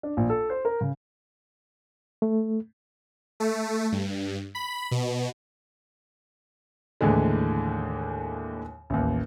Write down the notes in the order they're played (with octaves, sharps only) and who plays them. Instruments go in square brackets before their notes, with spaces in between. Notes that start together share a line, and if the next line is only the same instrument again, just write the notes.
[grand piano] D4
A#1
A4
C5
A#4
C#3
[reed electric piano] A3
[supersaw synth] A3
G2
B5
B2
[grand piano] D#2 A2 D3 E3 G#3
A1 D#2